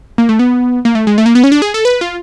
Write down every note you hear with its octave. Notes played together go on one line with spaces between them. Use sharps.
A#3
A3
B3
A#3
A3
G#3
A3
A#3
B3
C#4
D4
G#4
A4
B4
F4